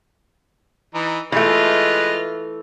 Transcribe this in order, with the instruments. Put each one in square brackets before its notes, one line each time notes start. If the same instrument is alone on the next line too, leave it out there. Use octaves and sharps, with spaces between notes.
[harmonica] E3 D#4
[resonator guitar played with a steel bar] E3 A3 [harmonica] G#3 B4 D#5 [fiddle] F4 F6